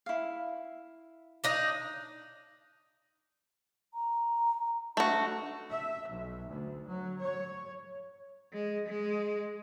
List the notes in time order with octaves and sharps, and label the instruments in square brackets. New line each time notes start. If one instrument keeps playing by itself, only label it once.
[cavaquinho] E4 F5
[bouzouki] D4 D#4 D#5
[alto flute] A#5
[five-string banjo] A3 F#4 [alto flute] D4
[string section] E5
B1
D2
F#3
C#5
[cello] G#3
G#3